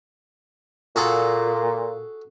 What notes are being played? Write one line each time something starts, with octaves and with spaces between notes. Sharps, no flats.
A#2 F#4 G#4 A4